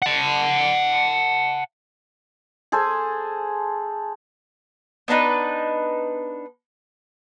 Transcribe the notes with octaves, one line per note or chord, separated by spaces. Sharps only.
F#5 A5
G#4 A4 C5 G#5
B3 D4 D#4 B4